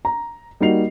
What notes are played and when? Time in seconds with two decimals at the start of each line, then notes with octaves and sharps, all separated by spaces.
0.05 A#5
0.60 G3 A#3 D#4 F#4 C7 F7